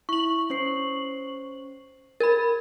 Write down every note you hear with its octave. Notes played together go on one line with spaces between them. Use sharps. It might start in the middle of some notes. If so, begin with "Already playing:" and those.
E4 C#6 F#7
C#4 C5 C7
A#4 B5 G#6 A6